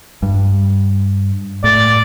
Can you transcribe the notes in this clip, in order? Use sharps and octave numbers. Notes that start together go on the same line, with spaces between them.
G2
A2 D5